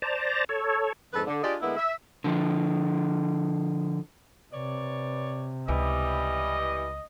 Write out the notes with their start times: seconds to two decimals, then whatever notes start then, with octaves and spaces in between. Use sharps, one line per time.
0.02 C5 D5 A5 A#5
0.49 A4 C#5
1.13 F2 G#2 D3 A4 B4
1.27 D3
1.43 D4 F4 G4 G#4 D5 D#5
1.61 D3 G#3 A#3 B3 E4
1.77 E5
2.24 D3 F3
4.53 C3 B4 C#5 D5
5.68 C#2 E3 G3 D#5